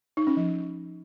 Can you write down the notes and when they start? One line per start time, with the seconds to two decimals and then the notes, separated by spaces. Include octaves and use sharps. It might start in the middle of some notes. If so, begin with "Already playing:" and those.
0.17 D#4
0.27 C#4
0.37 F3